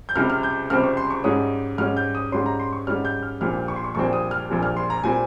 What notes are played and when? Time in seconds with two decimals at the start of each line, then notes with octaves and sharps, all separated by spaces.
0.09 G6
0.15 C#2 C3 G3 C4 F6
0.30 F6
0.43 G6
0.70 C#2 C3 G3 C4 F6
0.84 C#6
0.97 C6
1.10 C#6
1.24 G#2 G3 C#4 D#6
1.78 G#2 G3 C#4 F6
1.97 G6
2.15 D#6
2.32 G#2 G3 C#4 C6
2.46 A#5
2.60 C6
2.73 C#6
2.87 G#2 G3 C#4 F6
3.05 G6
3.23 F6
3.41 A#1 A#2 G3 C4 F6
3.68 C#6
3.76 C6
3.84 C#6
3.95 A#1 A#2 G3 C4 C#6
4.13 D#6
4.31 F6
4.49 A#1 A#2 G3 C4
4.63 F6
4.77 C6
4.90 A#5
5.04 A#2 G3 C4 G#5